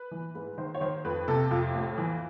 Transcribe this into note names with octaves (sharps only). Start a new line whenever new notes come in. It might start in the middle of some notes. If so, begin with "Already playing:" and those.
Already playing: B4
E3
G#2 B4
D#3 C5
C#5
D#3 C5
F2 B4
C3 A4
F2 F4
A2
E3